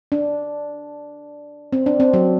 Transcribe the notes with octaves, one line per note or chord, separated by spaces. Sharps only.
D4
C4
D4
C4
F#3